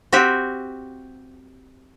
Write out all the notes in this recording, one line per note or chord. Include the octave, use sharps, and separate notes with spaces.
C4 F#4 G4 E5